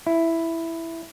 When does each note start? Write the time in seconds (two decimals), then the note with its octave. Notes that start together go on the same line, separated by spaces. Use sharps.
0.07 E4